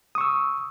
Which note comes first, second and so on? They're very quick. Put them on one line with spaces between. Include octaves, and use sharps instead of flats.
D#6 C#6 E6